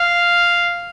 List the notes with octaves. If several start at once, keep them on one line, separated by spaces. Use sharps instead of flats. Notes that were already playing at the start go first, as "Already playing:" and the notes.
Already playing: F5